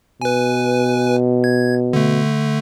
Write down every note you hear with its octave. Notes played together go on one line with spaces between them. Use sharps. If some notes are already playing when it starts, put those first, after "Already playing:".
B2 B4 G#5
G#6
D3 A3